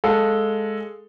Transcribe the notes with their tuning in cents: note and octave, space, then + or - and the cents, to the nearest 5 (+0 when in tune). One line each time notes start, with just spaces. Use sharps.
G#3 +0 A4 +0 F5 +0